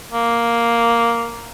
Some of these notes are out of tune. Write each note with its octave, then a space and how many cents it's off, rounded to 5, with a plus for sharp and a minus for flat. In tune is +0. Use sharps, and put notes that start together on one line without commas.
A#3 +0